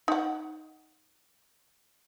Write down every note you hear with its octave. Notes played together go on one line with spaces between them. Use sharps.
D#4 F#5